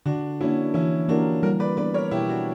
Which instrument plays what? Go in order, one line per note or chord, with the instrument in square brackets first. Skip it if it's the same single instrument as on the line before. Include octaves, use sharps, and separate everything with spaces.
[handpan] D3 [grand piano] D4 F#4
[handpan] A#3 D4 F#4 [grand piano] C#4 E4
[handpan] E3 [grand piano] C#4 E4
[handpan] A#3 E4 G4 A#4 [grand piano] D4 F#4
[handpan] G3 [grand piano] F#4 A#4
[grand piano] B4 D5
[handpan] B3 D4 [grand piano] B4 D5
[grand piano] A#4 C#5
[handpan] B2 [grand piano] E4 G4
[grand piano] D4 F#4